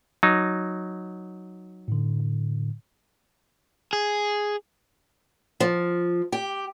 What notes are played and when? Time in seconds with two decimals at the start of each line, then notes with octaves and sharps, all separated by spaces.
0.23 F#3 D#4
1.88 A2 D3
3.93 G#4
5.60 F3
6.32 G4